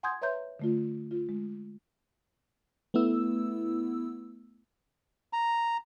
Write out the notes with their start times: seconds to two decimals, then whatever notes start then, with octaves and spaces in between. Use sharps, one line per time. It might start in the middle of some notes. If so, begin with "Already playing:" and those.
0.03 F#5 G#5 C6 D#6 G6 G#6
0.22 B4 C#5 E5 A#5 C6 G6
0.59 D3 A3 F4
1.11 F4
1.29 G#3
2.94 A3 B3 E4 E6
5.33 A#5